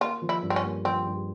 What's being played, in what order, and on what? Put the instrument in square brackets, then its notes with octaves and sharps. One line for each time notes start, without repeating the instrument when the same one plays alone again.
[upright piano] A#3 [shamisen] F4
[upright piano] F3
[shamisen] E4
[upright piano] G2
[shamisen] C4
C#4
[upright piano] A#3
[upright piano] F3 [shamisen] C4
[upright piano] G2